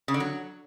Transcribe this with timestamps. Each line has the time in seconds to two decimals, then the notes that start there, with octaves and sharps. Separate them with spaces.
0.08 C#3
0.14 D3
0.20 F#3